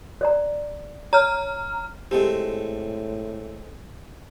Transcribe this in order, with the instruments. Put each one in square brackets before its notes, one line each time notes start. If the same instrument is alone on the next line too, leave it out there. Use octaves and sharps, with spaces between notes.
[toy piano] C5 D5 A#5
[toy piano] C#5 [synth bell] A#5 F6
[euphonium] A2 [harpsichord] G#3 A3 C4 [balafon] G4